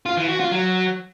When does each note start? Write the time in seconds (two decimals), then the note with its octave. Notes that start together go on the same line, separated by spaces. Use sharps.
0.06 F4
0.17 E3
0.29 F#4
0.40 F4
0.51 F#3